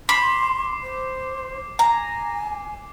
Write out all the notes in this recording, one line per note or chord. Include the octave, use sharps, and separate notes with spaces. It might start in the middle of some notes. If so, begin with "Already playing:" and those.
B5 C6 D6 C7
C5
G#5 A#5